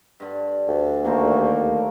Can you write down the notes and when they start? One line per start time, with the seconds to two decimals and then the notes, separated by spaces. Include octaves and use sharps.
0.20 G2 D3
0.68 D2
1.05 D#2 F#3 G3 A3 A#3 C5